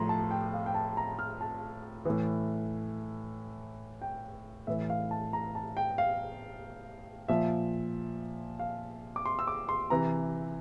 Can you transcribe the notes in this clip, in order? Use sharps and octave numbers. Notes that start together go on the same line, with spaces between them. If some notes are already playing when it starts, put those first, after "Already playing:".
Already playing: A2 F3 A#5 C6
A5
G5
F5
G5
A5
A#5
F6
A5
A2 E3
G5
A2 E3 E5
F5
A5
A#5
A5
G5
F5
A#2 F3 E5
F5
D6
C6
E6
D6
C6
C3 E3 A#5